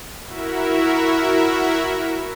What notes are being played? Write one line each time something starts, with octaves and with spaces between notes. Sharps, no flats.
E4 F#4 A#4 E5